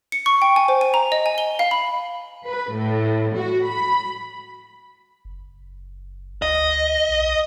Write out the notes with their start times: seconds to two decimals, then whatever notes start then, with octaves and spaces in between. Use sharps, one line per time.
0.12 C#7
0.26 C#6
0.42 G5
0.56 G#5
0.68 C5
0.81 G#5
0.94 A#5
1.12 D#5
1.26 G#5
1.38 G7
1.59 F5
1.71 B5
2.45 B4
2.74 A2
3.36 F#4
3.67 B5
5.25 F#1
6.42 D2 D#5
7.08 B1